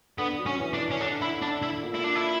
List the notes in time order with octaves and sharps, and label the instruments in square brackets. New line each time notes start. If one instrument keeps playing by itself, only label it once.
[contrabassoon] D3 [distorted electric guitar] B3
[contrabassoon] F#3
[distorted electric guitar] C#4
[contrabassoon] E3
[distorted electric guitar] D4
[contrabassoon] E3
[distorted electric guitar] C#4
[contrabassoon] D3 [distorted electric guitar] D4
[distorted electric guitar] E4
D4
E4
[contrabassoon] A#2
[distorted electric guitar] E4
D4
E4